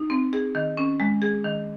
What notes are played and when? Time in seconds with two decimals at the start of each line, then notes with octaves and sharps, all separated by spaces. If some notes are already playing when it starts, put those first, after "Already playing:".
Already playing: D#4
0.10 C4
0.33 G#4
0.55 D#3
0.77 C#4
1.00 G#3
1.22 G#4
1.44 D#3